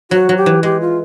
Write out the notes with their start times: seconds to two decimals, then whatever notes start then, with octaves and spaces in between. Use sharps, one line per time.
0.11 F#3 F#4
0.29 F#3
0.37 G4
0.46 E3
0.63 G#3 G4
0.81 F4